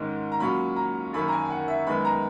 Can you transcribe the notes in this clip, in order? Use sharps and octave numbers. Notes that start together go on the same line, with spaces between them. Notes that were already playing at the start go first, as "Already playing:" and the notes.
Already playing: G#2 D#3 G#3 C#4
A#5
A#2 F#3 C#4 B5
A#5
F#2 D#3 A#3 C#4 B5
A#5
G#5
G#5
F#5
E5
F#2 D#3 G#3 B3 B5
A#5